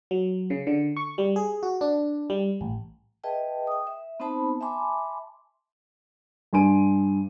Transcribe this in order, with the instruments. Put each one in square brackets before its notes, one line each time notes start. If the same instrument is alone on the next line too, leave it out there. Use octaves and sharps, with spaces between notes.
[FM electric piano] F#3
C#3
D3
C#6
G3
G#4
F#4
D4
G3
A1
[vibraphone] G#4 B4 D#5 E5 G5 A5
G5 D#6
E5
B3 C4 D#4 C5 A5 B5
E5 G#5 A5 B5 C6 D6
[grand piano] G2 G#5 C6 D7 D#7